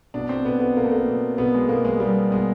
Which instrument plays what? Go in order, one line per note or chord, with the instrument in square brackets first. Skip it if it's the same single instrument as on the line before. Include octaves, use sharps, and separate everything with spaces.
[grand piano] B2 D4
C4
B2 B3
B3
B2 A#3
A3
A#3
B2
B2 B3
G#3
B2 A#3
G#3
B2 G3
B2 G#3